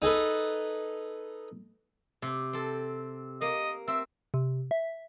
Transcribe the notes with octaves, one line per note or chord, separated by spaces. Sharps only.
D#4 G#4 A4 B4
C3
C4 A4
A#3 D#5
C4 E5
C3
E5